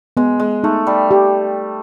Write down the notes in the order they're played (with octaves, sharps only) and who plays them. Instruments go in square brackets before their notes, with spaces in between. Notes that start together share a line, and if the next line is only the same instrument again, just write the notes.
[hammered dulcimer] G#3 [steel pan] B3
[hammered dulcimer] G#3
[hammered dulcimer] A3 [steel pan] D#4
[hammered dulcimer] G3
[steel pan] G4